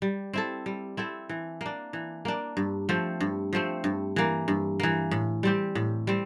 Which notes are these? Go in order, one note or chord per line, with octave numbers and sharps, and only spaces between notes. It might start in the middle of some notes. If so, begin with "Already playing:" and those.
G3
C4 E4 A4
G3
C4 E4 A4
E3
A#3 D4
E3
A#3 D4
G2
F3 A3 C4
G2
F3 A3 C4
G2
E3 A#3
G2
E3 A#3
A2
G3 C4 G4
A2
G3 C4